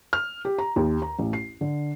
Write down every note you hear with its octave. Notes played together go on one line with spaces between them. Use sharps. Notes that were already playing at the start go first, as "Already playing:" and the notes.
F6
G4
A#5
D#2
A#5
A1
C7
D3